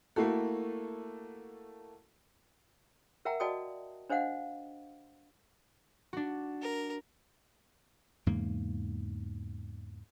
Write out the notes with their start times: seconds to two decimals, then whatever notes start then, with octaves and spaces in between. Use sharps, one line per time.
0.16 A3 A#3 E4 F#4 A4
3.25 A#4 E5 F#5 G5 A#5
3.40 F#4 D5 D#5 G5 A5 D#6
4.10 D4 C5 D#5 F5 F#5
6.13 D4 F#4
6.62 A#4
8.26 E2 G#2 C#3 A#3